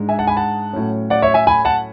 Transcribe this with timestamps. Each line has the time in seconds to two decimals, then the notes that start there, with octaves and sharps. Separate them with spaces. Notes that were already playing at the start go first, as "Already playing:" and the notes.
Already playing: G#2 G#3 D4
0.09 E5 G#5
0.19 F#5 A5
0.27 G#5 B5
0.37 F#5 A5
0.73 A2 F#3 C#4
1.10 D5 F#5
1.22 C#5 E5
1.34 E5 G#5
1.47 G#5 B5
1.65 F#5 A5